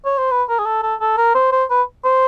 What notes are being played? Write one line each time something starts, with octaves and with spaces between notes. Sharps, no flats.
C#5
C5
B4
A#4
G#4
A4
A4
A4
A#4
C5
C5
B4
C5